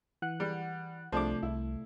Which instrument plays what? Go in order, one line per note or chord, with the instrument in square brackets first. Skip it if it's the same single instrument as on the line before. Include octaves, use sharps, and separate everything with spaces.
[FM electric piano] E3 F#5 F#6
[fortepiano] G3
[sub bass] C2 [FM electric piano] C3 A3 [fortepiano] F3 D4 D6
[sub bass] C2 [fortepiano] E4